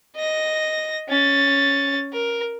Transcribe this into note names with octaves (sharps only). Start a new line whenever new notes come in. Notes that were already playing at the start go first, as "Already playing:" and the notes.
D#5 A#6
C#4 A6
A#4